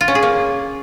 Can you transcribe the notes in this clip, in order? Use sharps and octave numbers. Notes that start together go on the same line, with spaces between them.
F4
C#4
G#4
A#3